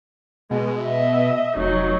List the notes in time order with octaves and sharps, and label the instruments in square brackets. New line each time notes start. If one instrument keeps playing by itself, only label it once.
[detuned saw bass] B2 [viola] G#3
[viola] D#5 E5
[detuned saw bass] F1 [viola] F#3 D#4